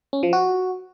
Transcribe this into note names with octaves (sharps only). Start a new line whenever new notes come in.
C#4
F3
F#4